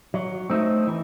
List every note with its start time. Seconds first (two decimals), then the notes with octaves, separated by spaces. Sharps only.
0.14 F#3
0.50 A3 C4 D#4
0.87 E3